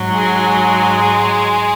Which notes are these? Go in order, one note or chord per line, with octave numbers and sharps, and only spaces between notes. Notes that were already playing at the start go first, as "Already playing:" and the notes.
Already playing: G#2 F#3
G#3 G#4